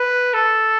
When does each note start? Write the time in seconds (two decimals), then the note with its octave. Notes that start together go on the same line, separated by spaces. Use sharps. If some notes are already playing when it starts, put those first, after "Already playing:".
Already playing: B4
0.33 A4